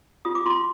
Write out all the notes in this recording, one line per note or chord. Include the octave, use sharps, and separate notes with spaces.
F4 D#6
D6
F4 C6